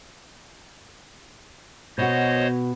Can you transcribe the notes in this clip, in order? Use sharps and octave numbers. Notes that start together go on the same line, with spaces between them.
B2 F#4 C5 C#5 D#5